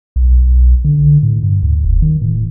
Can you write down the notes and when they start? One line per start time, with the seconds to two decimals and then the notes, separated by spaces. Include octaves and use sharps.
0.16 B1
0.85 D3
1.23 A2
1.43 G2
1.63 D2
1.84 E1
2.02 D#3
2.22 A2